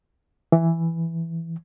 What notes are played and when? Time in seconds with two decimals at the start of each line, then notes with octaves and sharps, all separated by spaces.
0.52 E3